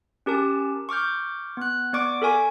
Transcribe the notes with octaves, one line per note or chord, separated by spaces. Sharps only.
C#4 G4 A#4 A5
C#6 D6 F6 G6
B3 F#6
B3 D5 C#6 D6 D7
A4 A#4 G#5 C#6